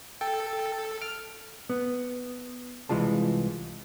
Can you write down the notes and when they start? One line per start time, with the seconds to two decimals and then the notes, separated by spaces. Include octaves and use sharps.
0.21 A4 G5
1.02 F6 D7
1.70 B3
2.89 C2 E3 G#3 F4 A5